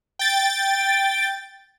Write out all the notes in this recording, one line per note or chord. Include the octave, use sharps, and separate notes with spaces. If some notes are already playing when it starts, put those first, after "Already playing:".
G5 A6